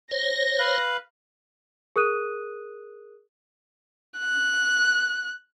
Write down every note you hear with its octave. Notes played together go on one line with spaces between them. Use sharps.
C5 C#5 A#6
B4 F5 F#6
G#4 A#4 D#6 F#6 D#7
F#6